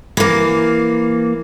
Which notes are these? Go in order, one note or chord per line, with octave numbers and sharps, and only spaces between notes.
E3 A#3